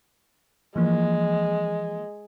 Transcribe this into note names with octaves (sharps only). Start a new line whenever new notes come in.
E3 F3 G#3 A#3